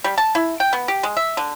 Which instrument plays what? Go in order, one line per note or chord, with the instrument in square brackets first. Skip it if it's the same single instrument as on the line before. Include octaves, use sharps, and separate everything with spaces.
[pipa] G3
A5
E4
G5
B3
G4
G#3
E5
D3